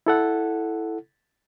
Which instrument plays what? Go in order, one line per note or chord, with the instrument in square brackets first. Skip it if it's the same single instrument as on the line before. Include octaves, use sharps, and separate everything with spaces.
[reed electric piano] E4 A4 F#5